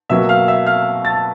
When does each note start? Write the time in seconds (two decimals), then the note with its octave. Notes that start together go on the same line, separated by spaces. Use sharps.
0.09 B2 F#3 A#3 E5 E6
0.29 F5 F6
0.48 E5 E6
0.66 F5 F6
1.05 A5 A6